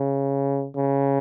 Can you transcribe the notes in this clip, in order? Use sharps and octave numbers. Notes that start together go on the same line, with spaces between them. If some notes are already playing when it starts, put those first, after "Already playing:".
Already playing: C#3
C#3